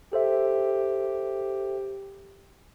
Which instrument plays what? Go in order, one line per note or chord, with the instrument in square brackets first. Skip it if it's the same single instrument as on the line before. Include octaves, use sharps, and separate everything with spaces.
[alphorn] G4 [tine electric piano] A4 C5 E5